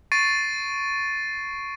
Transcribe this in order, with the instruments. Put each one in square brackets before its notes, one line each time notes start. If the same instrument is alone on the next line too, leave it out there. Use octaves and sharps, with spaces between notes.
[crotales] C#6 A6 C7 D7 D#7